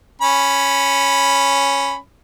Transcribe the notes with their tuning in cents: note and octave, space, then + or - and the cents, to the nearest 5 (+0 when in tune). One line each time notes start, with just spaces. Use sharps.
C#4 +0 B5 +0